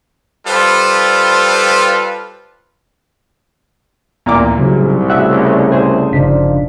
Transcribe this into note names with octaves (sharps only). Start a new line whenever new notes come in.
G3 F4 A4 B4 C5
A1 D2 A#2 B3 A#5 D6
C2 G#2 C#3 F#3
C#3 A3 F#4 E5 E6 F#6
G#4 C5
G1 C#3 F3 D4 D#4 B6